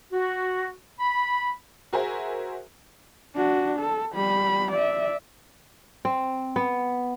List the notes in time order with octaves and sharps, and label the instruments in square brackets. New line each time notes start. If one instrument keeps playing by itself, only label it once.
[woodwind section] F#4
B5
[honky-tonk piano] F#4 G#4 A#4 C5 E5 G#5
[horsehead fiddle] D4 F#4
A4
G3 B5
D5 E5
[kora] C4
B3